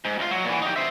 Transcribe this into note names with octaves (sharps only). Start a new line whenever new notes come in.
G#2
D2 F4
F#3
A#2 E3
D#4 G4
C5 E5